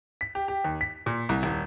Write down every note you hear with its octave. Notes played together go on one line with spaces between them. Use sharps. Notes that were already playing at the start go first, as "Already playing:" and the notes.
B6
G4
G4
D#2
B6
A#2
C2
D#1